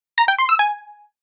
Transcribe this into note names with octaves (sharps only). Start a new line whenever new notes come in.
A#5
G5
C6
E6
G#5